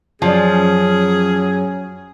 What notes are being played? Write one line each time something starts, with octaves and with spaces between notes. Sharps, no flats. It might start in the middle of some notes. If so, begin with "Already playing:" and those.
F#2 F3 F#3 C#4 G#4 D5